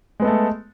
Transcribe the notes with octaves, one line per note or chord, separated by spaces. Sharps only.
G#3 A3 B3 A4